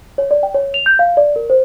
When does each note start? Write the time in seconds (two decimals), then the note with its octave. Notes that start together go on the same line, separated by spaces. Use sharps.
0.18 C#5
0.31 D5
0.43 G5
0.54 C#5
0.74 F7
0.86 G6
0.99 F5
1.17 D5
1.36 A#4
1.50 C5